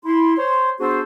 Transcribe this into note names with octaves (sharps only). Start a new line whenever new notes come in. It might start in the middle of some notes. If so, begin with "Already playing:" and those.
E4 C6
C5 C#5 C6
B3 D4 F#4 G#4 A4 C5